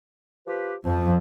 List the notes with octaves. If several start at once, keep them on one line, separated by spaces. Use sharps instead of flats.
F3 G4 B4
F2 F3